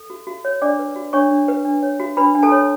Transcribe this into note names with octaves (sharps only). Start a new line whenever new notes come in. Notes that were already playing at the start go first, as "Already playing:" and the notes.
Already playing: A4
F#4
F#4
C#5
D4 D5 D6
B4
F#4
D4 C#5 C#6
D4
B4
D4
C#5
F#4
D4 B4 B5
D4
A4 A5
C#5